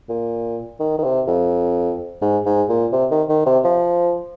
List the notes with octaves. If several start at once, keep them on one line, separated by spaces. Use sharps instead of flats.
A#2
D#3
D#3
C3
F2
G#2
G#2
A#2
C3
D#3
D#3
C3
F3